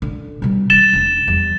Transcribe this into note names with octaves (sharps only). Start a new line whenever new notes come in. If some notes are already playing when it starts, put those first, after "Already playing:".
A#2 D3
B2 G3
D#3 G3 A6 E7 G7
E1 D4
E2 G3